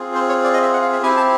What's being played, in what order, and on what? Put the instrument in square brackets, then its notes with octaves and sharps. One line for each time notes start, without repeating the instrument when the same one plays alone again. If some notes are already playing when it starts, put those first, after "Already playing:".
Already playing: [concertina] C4 F4 G#4
C5
C#5
D5
D#5
E5
F#5
F5
E5
C4 E4 G4 G#5
A5